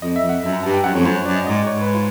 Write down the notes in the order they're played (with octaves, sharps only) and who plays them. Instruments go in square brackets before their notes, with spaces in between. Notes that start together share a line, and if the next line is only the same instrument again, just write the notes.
[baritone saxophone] F2 [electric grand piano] D#5
[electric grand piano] E5
[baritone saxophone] F2
[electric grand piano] F#5
[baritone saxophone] F#2 [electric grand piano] E5
[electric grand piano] A#5
[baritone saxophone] G2 [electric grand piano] A5
[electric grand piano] G5
[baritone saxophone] F#2 [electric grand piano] F#5
[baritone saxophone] F2 [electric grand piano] C#5
[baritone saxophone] F#2 [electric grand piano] C5
[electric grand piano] C#5
[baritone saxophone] F#2 [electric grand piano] D5
[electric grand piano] D#5
[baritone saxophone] G#2 [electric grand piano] D#5
[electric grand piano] D5
[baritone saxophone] G#2 [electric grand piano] C#5
[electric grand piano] B4
F4